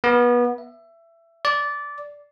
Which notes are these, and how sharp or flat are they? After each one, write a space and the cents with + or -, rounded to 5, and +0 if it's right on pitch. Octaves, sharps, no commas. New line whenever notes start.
B3 -25
E5 +20
D5 -15